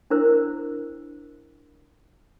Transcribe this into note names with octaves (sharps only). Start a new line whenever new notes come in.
D4 E4 A#4 C5